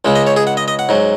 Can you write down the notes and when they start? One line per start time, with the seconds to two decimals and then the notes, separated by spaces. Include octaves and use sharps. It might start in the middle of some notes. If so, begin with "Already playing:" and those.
0.05 C#2 C#3 G#3
0.16 D#5
0.27 C#5
0.36 G#4
0.47 F#5
0.57 D#5
0.68 D#5
0.79 F#5
0.89 G#2 F#3